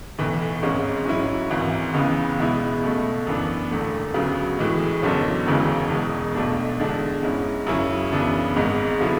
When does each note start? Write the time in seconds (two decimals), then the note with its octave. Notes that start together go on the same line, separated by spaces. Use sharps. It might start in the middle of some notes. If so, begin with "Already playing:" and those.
0.18 B1 A2 E3
0.62 G#1 G#2 G#3 C#4
1.06 G#2 F#3 C#4 E4
1.50 G#1 G#2 E3
1.94 C#2 C#3 E3 B3
2.39 E2 B2 G#3 B3 E4
2.83 C#2 B2 A3
3.27 F#2 E3 B3 D4
3.71 E1 E2 D3 A3
4.14 D2 C#3 F#3 B3
4.59 A2 E3 G#3
5.02 F#1 E2 D3 F#3 C#4
5.46 E1 D2 C#3 E3 G#3
5.90 E1 E2 B2 G#3
6.35 B1 B2 A3 D4
6.80 E2 D3 G#3 D4
7.23 G#2 G#3 C#4 E4
7.67 F#2 C#3 F#3 C#4 E4
8.12 F#2 C#3 E3 B3 D4
8.56 G#1 G#2 G#3
9.00 D3 F#3 B3 E4